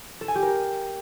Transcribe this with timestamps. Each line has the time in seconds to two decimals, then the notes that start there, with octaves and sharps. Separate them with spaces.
0.21 A4
0.28 G#5
0.35 G4
0.42 A#4